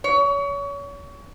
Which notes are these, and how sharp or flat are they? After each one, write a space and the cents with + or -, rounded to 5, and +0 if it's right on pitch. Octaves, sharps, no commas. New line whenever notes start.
C#5 +30